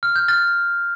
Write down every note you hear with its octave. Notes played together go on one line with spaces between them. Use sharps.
F6
G6
F6 A6